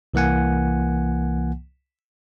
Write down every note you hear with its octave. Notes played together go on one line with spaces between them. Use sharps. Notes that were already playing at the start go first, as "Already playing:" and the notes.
C2 E3 A#3 F#5 G#5